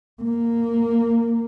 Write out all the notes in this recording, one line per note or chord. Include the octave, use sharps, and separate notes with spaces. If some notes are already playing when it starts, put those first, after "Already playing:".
A#3